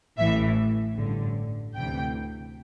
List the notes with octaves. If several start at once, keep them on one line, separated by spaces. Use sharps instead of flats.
A1 A2 E3 E5
A1 G2 D3
D2 C3 E3 G5